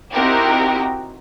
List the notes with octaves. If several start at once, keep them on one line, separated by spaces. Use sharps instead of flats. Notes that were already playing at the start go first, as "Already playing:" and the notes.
C4 D#4 E4 F#4 G4 A#4